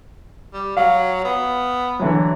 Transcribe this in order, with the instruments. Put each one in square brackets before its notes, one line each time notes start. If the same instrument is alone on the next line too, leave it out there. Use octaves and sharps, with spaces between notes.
[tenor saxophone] G3
[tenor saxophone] F#3 [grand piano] F5
[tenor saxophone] B3
[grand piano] D3 E3 F#3